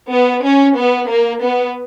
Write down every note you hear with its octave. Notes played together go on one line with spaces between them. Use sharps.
B3
C#4
B3
A#3
B3